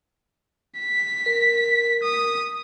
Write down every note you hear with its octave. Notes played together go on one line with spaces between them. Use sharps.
B6
A#4
D#6